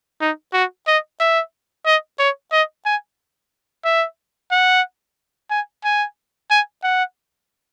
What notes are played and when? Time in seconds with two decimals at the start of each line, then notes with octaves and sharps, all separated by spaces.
0.21 D#4
0.54 F#4
0.87 D#5
1.20 E5
1.86 D#5
2.19 C#5
2.52 D#5
2.86 G#5
3.85 E5
4.51 F#5
5.51 G#5
5.85 G#5
6.51 G#5
6.84 F#5